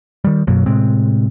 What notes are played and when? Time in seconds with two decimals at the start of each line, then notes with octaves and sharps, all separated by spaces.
0.24 D#3 G3
0.47 F#2 B2 F#3 A#3
0.66 A2 C3 G#3 C4